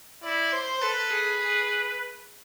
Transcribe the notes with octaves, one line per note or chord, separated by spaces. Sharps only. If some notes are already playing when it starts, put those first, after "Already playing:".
E4 D5
C5
A4 B4
G#4
G#4